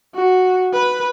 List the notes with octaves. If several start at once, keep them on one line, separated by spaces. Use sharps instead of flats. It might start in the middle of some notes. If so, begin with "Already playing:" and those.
F#4
B4